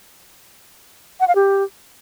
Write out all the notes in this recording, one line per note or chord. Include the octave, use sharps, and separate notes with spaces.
F#5
F5
G4